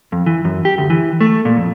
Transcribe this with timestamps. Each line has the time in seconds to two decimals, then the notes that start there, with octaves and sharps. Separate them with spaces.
0.12 F2
0.26 E3
0.45 F#2
0.65 G4
0.78 D2
0.90 E3
1.21 A3
1.45 A#2
1.57 F2